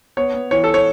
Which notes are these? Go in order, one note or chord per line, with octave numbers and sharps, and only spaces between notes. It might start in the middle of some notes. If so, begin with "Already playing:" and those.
B3 C#5
B3
E3 C#5
A4
C#5